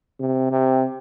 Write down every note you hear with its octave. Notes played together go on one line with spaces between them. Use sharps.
C3
C3